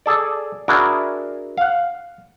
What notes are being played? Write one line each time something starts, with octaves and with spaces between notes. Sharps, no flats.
G#4 A4 D5
D4 E4 F#4 G#4 A#4
F5 F#5